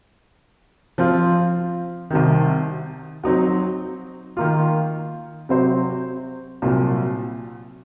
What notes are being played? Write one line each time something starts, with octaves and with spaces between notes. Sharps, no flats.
F3 C4 F4
C2 C3 D#3
F#3 C4 D#4 F#4
D#3 A#3 F4
C3 F#3 C4 F#4 C5
C2 A#2 F#3